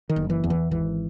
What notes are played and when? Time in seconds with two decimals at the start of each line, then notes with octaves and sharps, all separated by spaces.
0.09 D#3
0.16 F#1
0.30 E3
0.44 E2
0.50 E3
0.71 G#1 E3